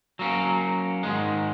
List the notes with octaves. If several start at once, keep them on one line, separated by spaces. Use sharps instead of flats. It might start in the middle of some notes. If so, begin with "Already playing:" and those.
F#3 A#3 C#4
G#2 D#3 G#3